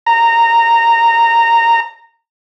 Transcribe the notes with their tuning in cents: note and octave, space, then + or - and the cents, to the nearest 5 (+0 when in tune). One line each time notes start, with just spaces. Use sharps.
A#5 -15